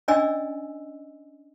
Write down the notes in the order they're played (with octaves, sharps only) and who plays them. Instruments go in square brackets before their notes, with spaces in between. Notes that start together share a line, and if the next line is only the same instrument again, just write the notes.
[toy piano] C#4 D4 D5 D#5 G#5 E6